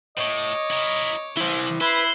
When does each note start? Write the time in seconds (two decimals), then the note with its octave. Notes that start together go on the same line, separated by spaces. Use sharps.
0.17 A2 C#5 D#5 D6
0.71 E4 A#4
1.37 E3 E4 C5
1.81 E4 B4 C5 F#6 C7